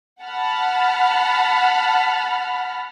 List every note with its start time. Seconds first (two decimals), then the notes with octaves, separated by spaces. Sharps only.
0.22 F#5 A5 B5 F6